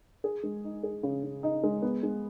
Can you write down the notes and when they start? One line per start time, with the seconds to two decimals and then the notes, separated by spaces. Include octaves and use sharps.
0.24 G#4
0.43 G#3
0.64 D#4
0.83 G#4
1.03 C#3
1.24 C#3
1.43 D#4
1.64 G#3
1.82 B3
2.03 G#3